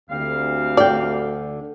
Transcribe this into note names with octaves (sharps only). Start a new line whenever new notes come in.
D2 G3 C4 F5
D3 D5 G5